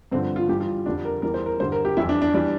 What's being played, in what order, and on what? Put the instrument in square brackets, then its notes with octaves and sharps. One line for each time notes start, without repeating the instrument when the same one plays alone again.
[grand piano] G2 D3 F3 C4
F4
G2 E3 G3 G4
F4
F2 D3 G3 D4
A#4
E2 E3 G3 A#4
C5
A#4
G2 D3 G3 C5
A#4
G4
F2 E3 G3 E4
D4
D4
E3 G3 D4